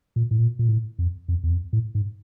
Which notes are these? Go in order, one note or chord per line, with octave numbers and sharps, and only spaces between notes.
A#2
A2
A#2
A#2
A2
F2
F2
E2
F2
A2
G#2